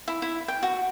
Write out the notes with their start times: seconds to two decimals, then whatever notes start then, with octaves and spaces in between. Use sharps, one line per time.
0.08 E4
0.22 E4
0.48 G5
0.63 F#4